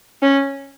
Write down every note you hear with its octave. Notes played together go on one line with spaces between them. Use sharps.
C#4